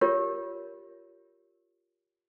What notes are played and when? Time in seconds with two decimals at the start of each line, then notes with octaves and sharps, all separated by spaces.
0.01 F4 G4 A#4 C#5